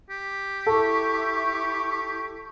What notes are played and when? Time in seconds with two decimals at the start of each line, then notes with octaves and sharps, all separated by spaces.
0.10 G4
0.66 E4 A4 C#6